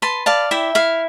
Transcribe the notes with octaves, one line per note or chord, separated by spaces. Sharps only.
B4 A5 C6
D5 F5 A5
E4 E5 G5
E4 F5